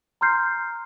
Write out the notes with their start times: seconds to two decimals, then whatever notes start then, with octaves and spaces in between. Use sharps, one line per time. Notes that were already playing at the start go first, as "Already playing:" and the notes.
0.21 A#5 C6 F6 G6 C7